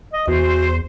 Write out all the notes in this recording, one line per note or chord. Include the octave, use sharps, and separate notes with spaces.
D#5
E2 F#4 C5